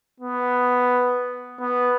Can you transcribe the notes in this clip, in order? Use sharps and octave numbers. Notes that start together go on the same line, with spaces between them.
B3
B3